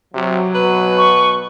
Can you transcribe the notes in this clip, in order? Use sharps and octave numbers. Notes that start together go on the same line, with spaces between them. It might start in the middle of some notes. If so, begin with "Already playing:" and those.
C3 F#3
B2 B4
C#6